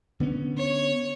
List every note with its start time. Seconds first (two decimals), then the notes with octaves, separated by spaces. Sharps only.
0.20 D3 B3 C#4
0.58 C#5